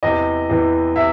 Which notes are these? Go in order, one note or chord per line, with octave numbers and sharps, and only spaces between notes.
E2 C3 E3 D#5
E2 C3 E3
C3 E5